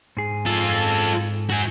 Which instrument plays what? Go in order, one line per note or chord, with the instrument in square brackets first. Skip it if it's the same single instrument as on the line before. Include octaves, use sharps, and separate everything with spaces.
[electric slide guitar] G#2 G#4
[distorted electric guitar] F4 A4
F#4 G#5